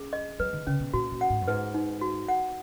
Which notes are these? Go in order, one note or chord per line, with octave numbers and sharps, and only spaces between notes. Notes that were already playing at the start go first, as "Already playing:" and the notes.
Already playing: C#4 G#4
D#5
F#3 B4
D#3
C#3 C#4
B2
A#2 F#4
A#2
F#5
G#2
F#2
G#2 B4
D#4
F#4
F#5